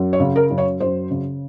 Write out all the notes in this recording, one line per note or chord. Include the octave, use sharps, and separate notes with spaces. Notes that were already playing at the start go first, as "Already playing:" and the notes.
Already playing: F#2
C#5
C#3
A#4
F#2
C#5
F#2 C5
C#3